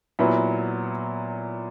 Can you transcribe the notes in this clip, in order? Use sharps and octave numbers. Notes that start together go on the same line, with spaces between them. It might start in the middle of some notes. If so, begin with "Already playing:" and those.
A#2 F#3 B3 E4